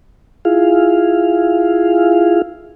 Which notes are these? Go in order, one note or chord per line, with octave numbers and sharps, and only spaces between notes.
E4 F4 G#4 F5